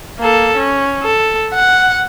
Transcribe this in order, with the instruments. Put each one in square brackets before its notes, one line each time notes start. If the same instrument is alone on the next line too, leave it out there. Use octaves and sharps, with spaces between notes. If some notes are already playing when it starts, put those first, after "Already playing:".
[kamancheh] A#3 A4
C#4
A4
F#5